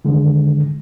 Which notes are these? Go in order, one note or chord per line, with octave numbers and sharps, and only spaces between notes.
D3 D#3 G#3